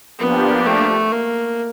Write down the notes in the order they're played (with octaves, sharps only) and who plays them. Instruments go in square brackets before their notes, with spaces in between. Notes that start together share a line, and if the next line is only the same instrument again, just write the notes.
[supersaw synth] F3 A#3 D4 G4 [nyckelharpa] B3
[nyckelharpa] A3
A#3